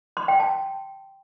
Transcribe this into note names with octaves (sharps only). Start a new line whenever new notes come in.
C6
G5
A5